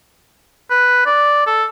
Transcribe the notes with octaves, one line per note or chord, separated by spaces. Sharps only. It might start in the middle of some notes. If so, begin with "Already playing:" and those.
B4
D5
A4